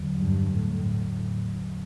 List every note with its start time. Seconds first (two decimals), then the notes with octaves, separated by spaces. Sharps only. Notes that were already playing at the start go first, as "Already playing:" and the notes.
Already playing: E2 D3 F#3
0.18 G2
0.52 A2